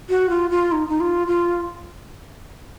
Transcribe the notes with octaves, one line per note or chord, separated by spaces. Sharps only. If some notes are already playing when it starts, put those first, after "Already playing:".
F#4
F4
F4
D#4
D#4
F4
F4